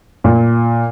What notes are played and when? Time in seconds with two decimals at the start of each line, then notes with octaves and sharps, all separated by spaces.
0.24 A#2